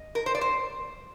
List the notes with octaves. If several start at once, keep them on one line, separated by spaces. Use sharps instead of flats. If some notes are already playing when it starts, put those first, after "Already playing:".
Already playing: D#5
A#4
C5
D5
C5